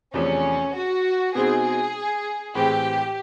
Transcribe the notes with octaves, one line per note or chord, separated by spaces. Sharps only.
E2 C3 F3 A3 C#4 D4
F#4
B2 G#3 C4 D#4 G#4
A2 E3 G#3 C4 G4